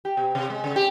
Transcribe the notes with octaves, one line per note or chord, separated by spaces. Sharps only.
G4
B2
C3
G#3
C#3
G4